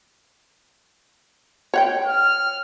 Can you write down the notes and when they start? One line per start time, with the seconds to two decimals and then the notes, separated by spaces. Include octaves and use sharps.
1.74 C#5 F#5 G5
2.06 F6